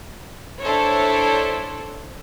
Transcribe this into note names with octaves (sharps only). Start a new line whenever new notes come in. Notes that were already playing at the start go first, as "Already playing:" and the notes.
D4 E4 A4 C5 C#5